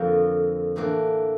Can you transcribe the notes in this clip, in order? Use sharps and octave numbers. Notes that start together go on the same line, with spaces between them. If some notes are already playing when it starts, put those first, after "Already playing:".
Already playing: F2 D3 F3 A#3 F4
A2 E3 A#3 D4